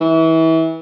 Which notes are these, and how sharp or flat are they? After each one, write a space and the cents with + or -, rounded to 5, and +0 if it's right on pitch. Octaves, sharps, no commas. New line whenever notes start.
E3 -30